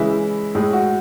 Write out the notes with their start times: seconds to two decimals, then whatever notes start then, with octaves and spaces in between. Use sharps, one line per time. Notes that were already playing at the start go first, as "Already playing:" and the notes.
Already playing: C#3 E3 G#3 E4 E5
0.55 A2 G#3 G#4
0.73 F#4